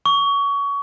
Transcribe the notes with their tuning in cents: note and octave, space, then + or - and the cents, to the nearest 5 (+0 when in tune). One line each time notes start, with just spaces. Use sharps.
C#6 +25